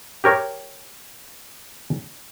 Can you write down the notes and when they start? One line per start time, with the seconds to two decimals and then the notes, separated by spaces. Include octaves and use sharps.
0.24 G4 A#4 C#5